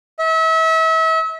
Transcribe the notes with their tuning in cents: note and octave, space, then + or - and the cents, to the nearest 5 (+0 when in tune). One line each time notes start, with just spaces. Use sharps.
E5 -35